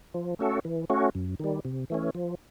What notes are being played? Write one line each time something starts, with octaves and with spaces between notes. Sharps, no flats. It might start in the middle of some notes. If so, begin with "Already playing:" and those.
F3
A3 C#4 F#4 A4
E3
A3 C#4 F#4
F#2
D#3 G3
C3
E3 A3 C#4
F3